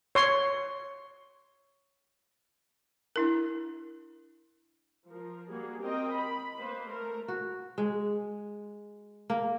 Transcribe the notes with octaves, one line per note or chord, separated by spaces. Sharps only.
C#5 C6
D4 E4 A#4
F3 A#4
G3 A#3 F#4 G#4
C4 A#4 D#5 G5
B5
A#3 B4 C5
A3 A#4
F#4
G#3
A#3